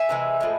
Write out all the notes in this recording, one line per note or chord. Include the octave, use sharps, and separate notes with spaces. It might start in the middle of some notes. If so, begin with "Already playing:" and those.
Already playing: E5 G#5
C3 E3 G#3
A2 F3 G#3